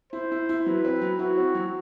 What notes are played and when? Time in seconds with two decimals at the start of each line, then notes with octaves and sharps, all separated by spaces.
0.13 E4 C5
0.32 E4
0.49 E4
0.66 F#3 B4
0.85 C4
1.01 F#3
1.19 E4 F#4
1.37 C4
1.55 F#3